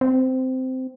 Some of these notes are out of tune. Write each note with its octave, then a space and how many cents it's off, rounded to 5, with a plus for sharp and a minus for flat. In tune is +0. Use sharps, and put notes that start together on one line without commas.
C4 -15